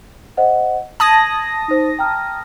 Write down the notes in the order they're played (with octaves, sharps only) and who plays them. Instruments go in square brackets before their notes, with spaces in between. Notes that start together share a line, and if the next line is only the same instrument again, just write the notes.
[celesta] C5 D#5 F#5
[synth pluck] A5 D#6 A#6 [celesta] G#6 D#7 F#7
[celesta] D#4 C5
G5 A#5 F6